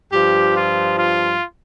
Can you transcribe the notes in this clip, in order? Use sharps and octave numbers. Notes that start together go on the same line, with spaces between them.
G2 F3 G4
F4
F4